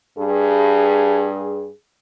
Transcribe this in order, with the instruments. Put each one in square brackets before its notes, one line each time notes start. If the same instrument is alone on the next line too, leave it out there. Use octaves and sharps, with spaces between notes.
[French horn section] G2 G#4